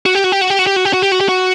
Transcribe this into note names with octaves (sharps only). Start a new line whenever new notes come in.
F#4
G4
F#4
G4
F#4
G4
F#4
G4
F#4
G4
F#4
G4
F#4
G4
F#4